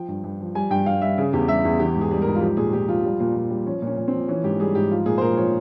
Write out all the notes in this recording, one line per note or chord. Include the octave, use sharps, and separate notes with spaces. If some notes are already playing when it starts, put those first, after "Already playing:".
Already playing: F3 G5
G2
G2
F3
G3 G#5
G2 G5
G2 F5
G3 E5
C#3 G#4
E2 G4
G3 E5
E2 G#4
E3 G4
G#2
G#4
G3
G#2 A#4
F4
F3 G4
A#2 G#4
A#2 G4
F3 F4
G3
A#2
A#2
G3
F3 C#4
A#2 C#4
A#2
F3 C4
E3 C#4
G#2 G4
G3 G#4
G#2 G4
F3 F4
A#2 G#4
C5
A#2 A#4
F3 C#5